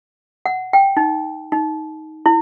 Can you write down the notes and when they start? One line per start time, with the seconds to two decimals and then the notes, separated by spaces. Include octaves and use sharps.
0.46 F#5
0.73 G5
0.97 D#4
1.52 D#4
2.26 E4